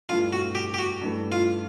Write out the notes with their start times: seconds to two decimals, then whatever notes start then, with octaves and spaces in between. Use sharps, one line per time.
0.09 G2 E3 A3 F4
0.33 F#4
0.55 G4
0.74 G4
0.78 F#4
1.01 G2 E3 A3
1.32 F4